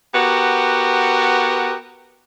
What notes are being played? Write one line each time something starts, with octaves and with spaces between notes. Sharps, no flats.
B3 F#4 G4 A#4